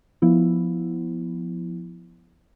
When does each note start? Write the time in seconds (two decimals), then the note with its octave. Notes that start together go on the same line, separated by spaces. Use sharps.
0.22 F3 B3 E4